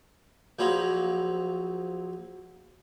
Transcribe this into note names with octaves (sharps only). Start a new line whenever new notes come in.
A#1 F3 F#3 C4 A#5 B5